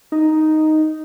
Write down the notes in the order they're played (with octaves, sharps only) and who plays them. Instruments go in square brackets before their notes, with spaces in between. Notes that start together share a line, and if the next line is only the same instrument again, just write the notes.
[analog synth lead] D#4